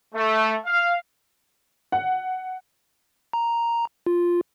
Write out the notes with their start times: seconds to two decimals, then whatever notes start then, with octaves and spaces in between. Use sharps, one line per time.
0.15 A3
0.65 F5
1.92 F#5
3.33 A#5
4.06 F4